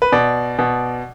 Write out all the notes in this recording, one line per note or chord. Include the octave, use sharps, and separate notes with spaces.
B4
B2 D5
B2